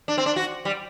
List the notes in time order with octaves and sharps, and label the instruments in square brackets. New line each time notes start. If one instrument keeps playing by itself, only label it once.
[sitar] D4
C4
D4
F#4
G3